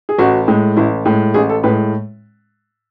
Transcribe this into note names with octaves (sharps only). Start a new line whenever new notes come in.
G#4
A1 F#4
A2 G#3
A1 E4
A2 G#3
A1 G#4
A4
A2 G#3 B4